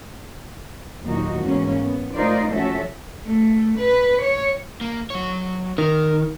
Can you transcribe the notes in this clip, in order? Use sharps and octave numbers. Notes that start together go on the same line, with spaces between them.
D#2 A#2 F#3 D#4 F#4
E2 G#2 A#3 C#4
B3
A3 D#4 F4 A#4 C5 D5
F3 A3 C#4 F#4 A4 E5
A3
B4
C#5
A#3
F#3 C#5
D#3 A#4